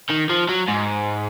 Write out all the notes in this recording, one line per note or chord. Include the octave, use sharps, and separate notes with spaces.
D#3
F3
F#3
G#2